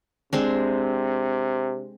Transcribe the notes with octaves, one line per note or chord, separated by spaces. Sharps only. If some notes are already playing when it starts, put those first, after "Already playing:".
C3 G#3 C4 D4